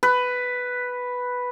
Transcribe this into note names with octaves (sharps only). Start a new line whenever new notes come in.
B4